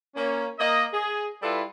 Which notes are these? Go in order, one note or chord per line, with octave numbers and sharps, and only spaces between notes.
A#3 C#4
A#3 D#5
G#4
G3 E4 F4 A4 B4